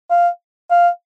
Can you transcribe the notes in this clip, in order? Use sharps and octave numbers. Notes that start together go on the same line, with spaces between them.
F5
F5